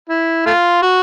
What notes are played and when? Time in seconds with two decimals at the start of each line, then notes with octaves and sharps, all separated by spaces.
0.09 E4
0.46 A3 F4
0.82 F#4